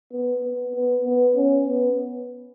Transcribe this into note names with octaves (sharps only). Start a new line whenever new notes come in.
B3
B3
B3
B3
C#4
B3